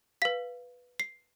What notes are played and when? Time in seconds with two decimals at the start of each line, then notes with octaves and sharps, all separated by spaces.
0.22 B4 F5 B6
1.00 C7